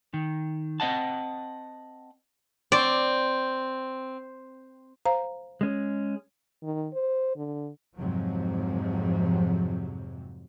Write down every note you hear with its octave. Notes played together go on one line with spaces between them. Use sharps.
D#3
C4 D#5 F#5 A5
C4 D5
C5 F5 A#5
G#3 C#4
D#3
C5
D3
F2 G#2 C3 F3 F#3